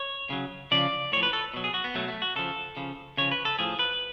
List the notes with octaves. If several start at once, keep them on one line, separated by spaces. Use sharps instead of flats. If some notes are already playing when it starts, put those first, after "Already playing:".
Already playing: C#5
C#3 F#3
C#3 F3 D5
A2 F3 C#5
B4
A4
B2 F#3
G#4
F#4
B3
B2 F#3 A3
A3
F#4
C#3 F3 A4
C#3 F3
C#3 F3 C#5
B4
A4
A2 F3 G#4
B4